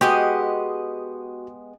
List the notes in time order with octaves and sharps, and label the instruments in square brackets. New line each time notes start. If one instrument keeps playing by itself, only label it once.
[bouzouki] G#3 B3 D#5 [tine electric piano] F#4 [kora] G4